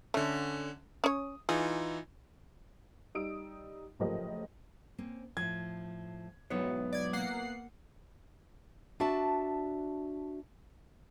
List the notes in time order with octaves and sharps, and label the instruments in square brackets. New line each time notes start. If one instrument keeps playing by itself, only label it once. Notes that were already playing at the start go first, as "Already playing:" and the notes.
[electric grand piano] D3 C#4 [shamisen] A3
[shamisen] C#4 C#5 [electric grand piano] D#6
[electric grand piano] E3 D#4 F4 [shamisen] G#4
[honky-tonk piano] G3 D#4 D#6 E6 D7
F#1 A2 F3 G4 A#4 D#5
[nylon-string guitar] A#3 C4 C#4
[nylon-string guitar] A2 F3 [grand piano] G#6
[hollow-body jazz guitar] B1 G#2 C#5 [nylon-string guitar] F#3 E4 [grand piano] B3
[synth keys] D5 G#6
A#3 F#5 C7
[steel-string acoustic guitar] D4 F#4 E5 A5